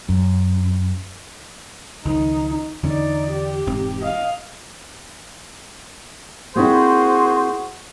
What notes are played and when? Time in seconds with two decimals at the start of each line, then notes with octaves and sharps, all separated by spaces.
0.09 F#2
2.05 C#2 D#3 F3 D#4
2.83 E2 D3 C#4 D#4 D5
3.32 G4
3.66 E1 G#2 C4
4.01 D#5 F5
6.56 A#3 C4 E4 F#4 G#4 C5